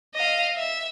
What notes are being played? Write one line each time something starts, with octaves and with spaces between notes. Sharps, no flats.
D#5 F5
E5